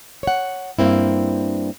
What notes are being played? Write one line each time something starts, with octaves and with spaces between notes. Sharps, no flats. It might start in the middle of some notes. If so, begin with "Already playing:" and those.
C#5 F#5
G2 A#3 C4 E4